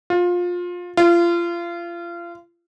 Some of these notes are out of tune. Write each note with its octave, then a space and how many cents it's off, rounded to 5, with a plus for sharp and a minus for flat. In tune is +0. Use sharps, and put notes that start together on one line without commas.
F4 +20
F4 -30